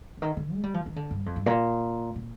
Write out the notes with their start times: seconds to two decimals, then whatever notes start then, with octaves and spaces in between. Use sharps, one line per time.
0.17 D3
0.22 D#3
0.37 D3
0.53 G#3
0.63 G3
0.74 F3
0.86 D#3
0.96 D3
1.11 G2
1.26 F2
1.36 G2
1.46 A#2
2.16 A#2